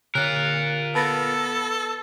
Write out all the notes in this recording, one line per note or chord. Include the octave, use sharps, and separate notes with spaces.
D3 F4 A#4 F#6
B3 A4 A5 A6 A#6